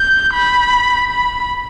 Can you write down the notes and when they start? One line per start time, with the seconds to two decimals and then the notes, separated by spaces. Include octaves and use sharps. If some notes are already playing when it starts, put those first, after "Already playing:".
Already playing: G6
0.34 B5
1.10 B5